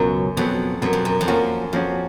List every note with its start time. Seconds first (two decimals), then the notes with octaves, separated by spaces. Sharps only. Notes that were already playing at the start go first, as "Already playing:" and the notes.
Already playing: C#2 F#2 B2 F#3
0.37 F2 B2 F#3 B3
0.82 F#2 B2 F#3 B3
0.93 F2
1.05 F#2
1.21 F2
1.28 F#2 F3 A#3 C#4 F#4
1.73 F2 F3 A#3 C#4 F#4